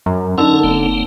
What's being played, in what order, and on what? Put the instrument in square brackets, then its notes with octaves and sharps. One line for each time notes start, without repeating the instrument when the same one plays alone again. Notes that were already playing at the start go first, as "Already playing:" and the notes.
[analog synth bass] F#2
[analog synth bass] D3 [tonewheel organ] C#4 A#4 [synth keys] D#4 A5 E6
[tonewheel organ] F#1 A#3 C4